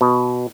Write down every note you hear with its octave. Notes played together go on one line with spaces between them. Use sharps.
B2